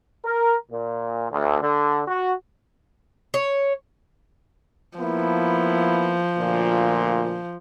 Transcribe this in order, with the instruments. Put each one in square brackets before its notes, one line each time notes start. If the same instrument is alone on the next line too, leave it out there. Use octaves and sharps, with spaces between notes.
[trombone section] A#4
A#2
D2
D3
F#4
[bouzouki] C#5
[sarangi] F3 [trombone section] A#3 B3 E4
[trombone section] D2 A#2